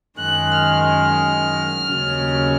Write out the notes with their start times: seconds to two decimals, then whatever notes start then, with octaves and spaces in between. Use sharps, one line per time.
0.19 F#2 D#3 G#3 F#6
0.62 F6
1.90 D#2 C#3 F#3